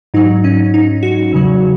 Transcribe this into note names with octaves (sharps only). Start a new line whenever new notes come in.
G#2 F#3 D#4
C#4
D#4
F#4
E2 C#3 F#3